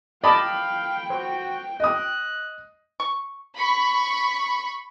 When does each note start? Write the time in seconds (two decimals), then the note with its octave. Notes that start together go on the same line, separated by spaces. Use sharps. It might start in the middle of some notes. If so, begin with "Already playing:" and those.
0.24 D5 D#5 F5 G5 A5 B5
1.10 F#4 C5
1.80 D#5 D#6 F#6
3.00 C#6
3.56 B5 C#6